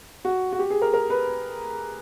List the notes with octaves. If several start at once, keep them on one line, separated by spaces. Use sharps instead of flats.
F#4
F#4
G4
G#4
A#4
A#4
B4